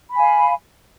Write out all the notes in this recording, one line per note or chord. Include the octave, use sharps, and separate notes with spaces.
F5 G#5 B5